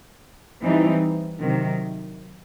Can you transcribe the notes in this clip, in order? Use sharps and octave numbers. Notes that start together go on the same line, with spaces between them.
E3 G3 C4 D#4
C3 D#3 F#3